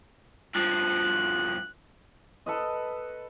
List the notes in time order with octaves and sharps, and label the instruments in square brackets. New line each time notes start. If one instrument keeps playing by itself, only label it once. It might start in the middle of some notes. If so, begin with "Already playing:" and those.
[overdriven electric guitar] G2 F3 [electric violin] F#6
[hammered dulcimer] A4 B4 D#5